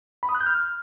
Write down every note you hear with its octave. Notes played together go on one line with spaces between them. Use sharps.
B5
D#6
F#6
G6
F6